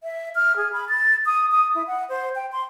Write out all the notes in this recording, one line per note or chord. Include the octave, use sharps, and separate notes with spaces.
E5
F6
G#4
B5
A6
D#6
D#6
E4
F#5
C5
G5
C6